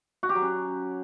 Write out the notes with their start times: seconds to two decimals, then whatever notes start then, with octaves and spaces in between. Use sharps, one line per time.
0.23 F#4
0.29 G4
0.36 F#3
0.42 C#4